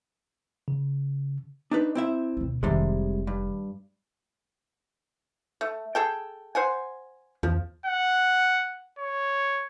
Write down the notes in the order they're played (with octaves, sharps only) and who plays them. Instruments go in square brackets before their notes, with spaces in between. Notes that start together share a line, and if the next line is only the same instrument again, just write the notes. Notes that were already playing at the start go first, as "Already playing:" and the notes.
[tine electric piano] C#3
[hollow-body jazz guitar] D4 D#4 B4
C4 E4 E5
[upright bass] D2 B2
[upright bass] F1 D#3 [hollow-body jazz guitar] C3 G3 G#3
[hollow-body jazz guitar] G2
[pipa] A3
G#4 A4 G5
C5 F#5 G#5
[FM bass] E2 [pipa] F3
[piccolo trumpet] F#5
C#5